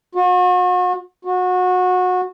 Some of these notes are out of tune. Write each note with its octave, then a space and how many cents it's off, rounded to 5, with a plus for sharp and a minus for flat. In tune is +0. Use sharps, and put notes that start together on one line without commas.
F#4 -40
F#4 -25